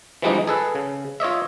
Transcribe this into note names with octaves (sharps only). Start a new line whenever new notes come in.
E3 F3 G3 G#3 D4 D#4
G#4 A4 B4
C#3
F4 C#5 D#5 E5